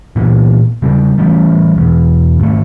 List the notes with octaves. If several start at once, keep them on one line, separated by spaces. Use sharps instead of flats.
A#2 E3 B3
C#3 G3 C4
E3 G3 A3 C#4
E1 E2
G#1 A3